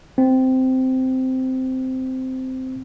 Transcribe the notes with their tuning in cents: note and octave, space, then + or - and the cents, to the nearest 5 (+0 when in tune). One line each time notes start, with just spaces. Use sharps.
C4 -10